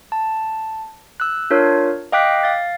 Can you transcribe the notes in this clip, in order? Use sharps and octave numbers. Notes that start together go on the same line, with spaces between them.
A5
E6 F#6
D4 F4 A#4 C#5
D#5 F5 G5 D6 F#6 B6
F5 A6